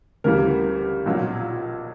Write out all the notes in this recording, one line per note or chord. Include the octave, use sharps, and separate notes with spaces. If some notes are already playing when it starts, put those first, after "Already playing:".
D2 C#3 E3 G3 A#4
B1 A#2 F#3